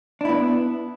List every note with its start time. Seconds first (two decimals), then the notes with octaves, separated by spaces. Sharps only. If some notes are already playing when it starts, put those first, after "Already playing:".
0.21 D4
0.25 E4
0.29 B3